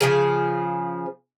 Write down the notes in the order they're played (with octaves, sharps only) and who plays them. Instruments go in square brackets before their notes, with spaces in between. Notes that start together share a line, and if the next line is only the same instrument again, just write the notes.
[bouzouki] C#3 F3 G#4